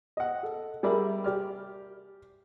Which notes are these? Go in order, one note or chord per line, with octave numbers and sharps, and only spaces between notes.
D#5 F#5
A4
G3 G#4 A#4 D5 E5 B5
G4 D5 F6